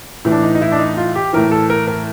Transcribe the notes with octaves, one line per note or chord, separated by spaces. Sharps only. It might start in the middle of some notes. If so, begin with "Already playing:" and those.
A2 E3
D4
D#4
D#4
E4
D4
D#4
F4
G4
A2 E3 A#4
A4
A#4
A#4